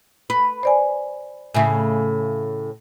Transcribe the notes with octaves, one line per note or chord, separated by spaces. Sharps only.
B4
C5 D5 G#5
A2 C#3 E5 G#5